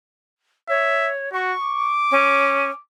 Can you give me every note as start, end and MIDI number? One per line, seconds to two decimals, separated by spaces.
0.69 1.32 73
0.69 1.11 76
1.33 1.53 66
1.33 1.93 85
1.63 2.80 86
2.11 2.70 61